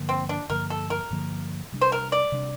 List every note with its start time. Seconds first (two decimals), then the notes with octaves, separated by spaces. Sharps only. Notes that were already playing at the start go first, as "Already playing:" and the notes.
Already playing: G2 D3 F3 A#3
0.09 C4
0.29 D4
0.50 G2 D3 F3 A#3 A#4
0.70 A4
0.90 A#4
1.10 G2 D3 F3 A#3
1.72 C3 G3 D4
1.81 C5
1.92 A#4
2.12 D5
2.32 C3 G3 D4